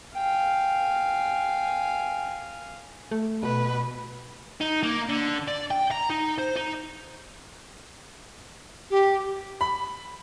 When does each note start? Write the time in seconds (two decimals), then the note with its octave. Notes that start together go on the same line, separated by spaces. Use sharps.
0.16 F5 G5 G#5
3.11 A3
3.43 B2 B4
4.61 D#4
4.83 A#3
5.08 D3
5.48 D5
5.71 G5
5.91 A#5
6.10 D#4
6.38 C5
6.56 D#4
8.90 G4
9.61 B5